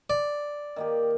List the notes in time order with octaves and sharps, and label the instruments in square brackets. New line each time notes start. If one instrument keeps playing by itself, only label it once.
[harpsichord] D5
[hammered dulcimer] D#3 A#3 G4